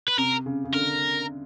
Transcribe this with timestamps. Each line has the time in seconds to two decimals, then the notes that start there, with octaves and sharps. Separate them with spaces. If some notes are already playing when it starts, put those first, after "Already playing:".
0.08 B4
0.18 C3 A#4
0.46 C#3
0.64 C#3
0.74 D3 A#4